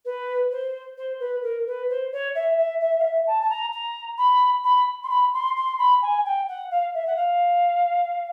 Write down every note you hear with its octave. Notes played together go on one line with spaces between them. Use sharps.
B4
C5
C5
B4
A#4
B4
C5
C#5
E5
E5
E5
F5
E5
A5
A5
A#5
A#5
B5
B5
C6
B5
C6
C6
B5
G#5
G5
F#5
F5
E5
F#5
F5